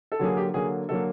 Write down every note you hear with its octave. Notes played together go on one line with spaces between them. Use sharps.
A4
D3 F#3 A#3 G#4
G4
D3 F#3 A#3 G#4
D3 F#3 A#3 A4